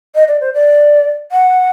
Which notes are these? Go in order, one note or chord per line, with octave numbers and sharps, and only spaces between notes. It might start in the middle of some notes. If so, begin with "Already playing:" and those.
D#5
D5
C5
D5
F#5